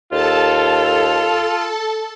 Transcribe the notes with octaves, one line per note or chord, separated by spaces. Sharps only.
D#2 F4 A4 A5